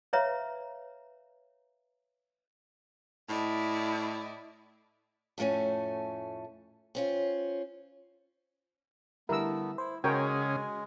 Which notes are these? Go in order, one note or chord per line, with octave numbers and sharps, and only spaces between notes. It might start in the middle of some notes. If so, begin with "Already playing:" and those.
B4 C#5 E5 F5 A#5
A2 E4 D5 D#5
F2 A2 A3 C#4 G#5
C4 C#4 F4
D3 G3 A3 B3 E4 A#4 E6
E4 C5
C#3 G#3 C#4 F#4 G#4 A#4 C#5 G5